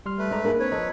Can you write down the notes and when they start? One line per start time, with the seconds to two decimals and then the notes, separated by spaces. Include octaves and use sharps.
0.06 G3 C6 F6
0.19 A3 B4
0.31 G#3 D5 A#5
0.45 A#3 D#4 G#4 A#4
0.60 C4 D4 B4 C#5
0.72 F3 A4 D#5 A#5